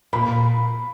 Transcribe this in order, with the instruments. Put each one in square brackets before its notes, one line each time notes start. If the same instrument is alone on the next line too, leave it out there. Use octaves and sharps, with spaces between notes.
[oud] A#2 [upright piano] B5